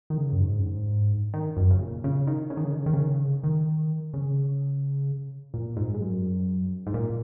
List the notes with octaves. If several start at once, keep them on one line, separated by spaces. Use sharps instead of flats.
D#3
C#3
F#2
G#2
F#2
G#2
D#3
F#2
C#3
A#2
C#3
D#3
C#3
D#3
C#3
D#3
C#3
D#3
C#3
D#3
C#3
D#3
C#3
A#2
G#2
G#2
F#2
G#2
A#2